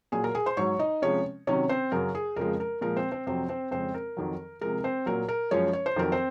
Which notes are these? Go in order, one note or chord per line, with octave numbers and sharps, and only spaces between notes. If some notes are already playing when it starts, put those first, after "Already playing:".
A#2 F#3 G#4 G#5
A#4 A#5
G#4 G#5
C5 C6
G#2 F#3 C#5 C#6
D#4 D#5
C3 F3 G#3 C#4 C#5
C3 D#3 F#3 C#4 C#5
C4 C5
F#2 C#3 F#3 A#4
G#4
F2 C#3 F3 G#3 A#4
A#4
A#2 F3 G#3 A#4
C4 C5
C4 C5
F2 C3 F#3 C4 C5
C4 C5
F2 C#3 G#3 C4 C5
A#4
F2 D#3 F#3
C3 F3 G#3 A#4
C4 C5
A#2 F#3 A#4
A#4
F#2 F3 G#3 C#4 C#5
C#5
C5
F2 D#3 F#3 A#4
C4 C5